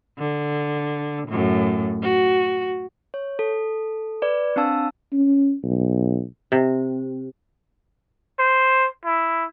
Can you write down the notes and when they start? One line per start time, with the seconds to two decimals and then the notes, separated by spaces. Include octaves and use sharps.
0.19 D3
1.28 F#2 A2
2.02 F#4
3.14 C#5
3.39 A4
4.22 B4 D5
4.56 C4 D4 F5 A5 E6
5.12 C#4
5.64 B1
6.52 C3
8.39 C5
9.05 E4